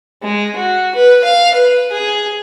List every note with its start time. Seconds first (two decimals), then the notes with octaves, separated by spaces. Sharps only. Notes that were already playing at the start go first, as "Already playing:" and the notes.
0.23 G#3
0.57 F#4
0.95 B4
1.24 F5
1.54 B4
1.92 G#4